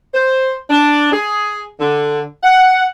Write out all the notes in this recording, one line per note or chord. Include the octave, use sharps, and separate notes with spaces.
C5
D4
G#4
D3
F#5